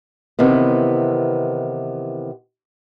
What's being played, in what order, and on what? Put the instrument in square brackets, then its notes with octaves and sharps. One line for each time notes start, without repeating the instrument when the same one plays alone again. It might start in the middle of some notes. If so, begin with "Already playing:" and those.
[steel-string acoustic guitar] C3 D#3 E3 B3